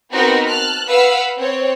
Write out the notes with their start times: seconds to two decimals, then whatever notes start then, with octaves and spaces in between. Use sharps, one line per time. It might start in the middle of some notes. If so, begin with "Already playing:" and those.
0.10 B3 C4 D#4 F#4 A#4 B4
0.48 A5 F6 F#6
0.87 B4 F5 F#5 E6
1.36 C4 C#5